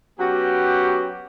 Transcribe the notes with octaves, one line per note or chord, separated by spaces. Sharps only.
F#3 B3 C#4 F#4 G4